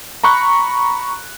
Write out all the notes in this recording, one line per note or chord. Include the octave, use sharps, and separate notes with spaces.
A#5 B5 C#6 F#6